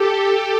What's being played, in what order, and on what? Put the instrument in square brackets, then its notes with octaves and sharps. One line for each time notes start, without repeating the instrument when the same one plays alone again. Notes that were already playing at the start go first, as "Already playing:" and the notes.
Already playing: [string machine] G4 A4